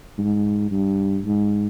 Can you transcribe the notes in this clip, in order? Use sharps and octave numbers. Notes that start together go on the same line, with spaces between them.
G#2
G2
G#2